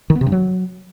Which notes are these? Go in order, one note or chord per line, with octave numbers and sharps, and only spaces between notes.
D#3
B3
C3
G2
F#3